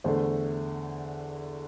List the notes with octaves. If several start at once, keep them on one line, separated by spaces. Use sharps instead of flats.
E2 D3 A3 C5